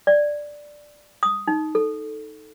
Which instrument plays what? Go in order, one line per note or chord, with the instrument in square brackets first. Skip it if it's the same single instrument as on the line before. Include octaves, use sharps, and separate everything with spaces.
[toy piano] D5
D#6
D#4
A4